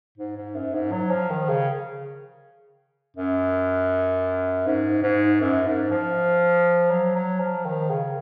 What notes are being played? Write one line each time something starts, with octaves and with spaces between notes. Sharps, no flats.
G#2
G#2
F#2
G#2
F#3
F3
D#3
C#3
F#2
G#2
G#2
F#2
G#2
F3
F#3
F#3
F3
D#3
C#3